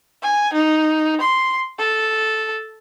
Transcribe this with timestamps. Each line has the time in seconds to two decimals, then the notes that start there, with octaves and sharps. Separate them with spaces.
0.22 G#5
0.53 D#4
1.20 C6
1.78 A4